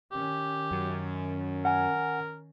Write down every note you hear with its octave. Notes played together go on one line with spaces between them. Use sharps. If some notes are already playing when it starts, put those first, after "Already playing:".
D#3 C#4 G4
F#2
A#4 F#5 G#5